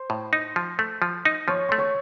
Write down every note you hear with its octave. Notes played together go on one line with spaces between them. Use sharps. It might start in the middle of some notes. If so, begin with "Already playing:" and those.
Already playing: C5 C6
A2
D#4
F3
A3
F3
D#4
F3 C#5 C#6
A3 C6
C#5 C#6